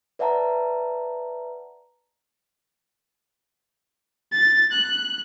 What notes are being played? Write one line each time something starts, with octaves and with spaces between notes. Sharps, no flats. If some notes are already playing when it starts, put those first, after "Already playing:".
B4 D5 E5 F#5 A5 A#5
A6
F#6